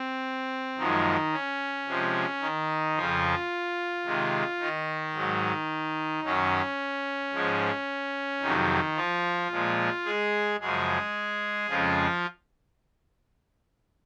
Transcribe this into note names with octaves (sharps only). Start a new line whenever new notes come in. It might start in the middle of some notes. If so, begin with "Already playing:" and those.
Already playing: C4
F#2 D#3 F3 G#3 D#4
C#4
C3 F3 G#3
D#3 D#4
F2 C#3 F3 F4
C3 D#3 G#3
D#3 D#4
G#2 F#3
F#2 D#3 F#3 C#4
G#2 F3 G#3
F2 C3 D#3 F#3 D#4
F3 F4
A#2 F3 G#3
G#3 G#4
F#2 C#3 F3 G#3 G#4
F2 C#3 F3 G#3 F4